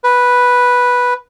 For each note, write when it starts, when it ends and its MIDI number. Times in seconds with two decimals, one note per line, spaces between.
0.04 1.14 71